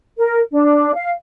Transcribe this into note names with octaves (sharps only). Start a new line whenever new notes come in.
A#4
D4
F5